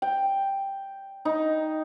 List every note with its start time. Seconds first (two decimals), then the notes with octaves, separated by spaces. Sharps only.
0.02 G5
1.25 D#4